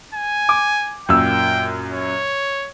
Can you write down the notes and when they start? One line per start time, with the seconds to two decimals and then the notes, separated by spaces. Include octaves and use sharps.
0.14 G#5
0.49 D6
1.09 F#2 A#2 G5 E6
1.91 C#5